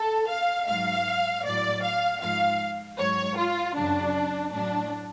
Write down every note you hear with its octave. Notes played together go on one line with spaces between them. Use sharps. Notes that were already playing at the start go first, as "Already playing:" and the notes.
Already playing: A4
F5
G#2 F#3 F5
A2 F#3 D5
F5
G#2 F3 F5
G#2 F#3 C#5
F4
F#2 C#3 F#3 D4
A2 F#3 D4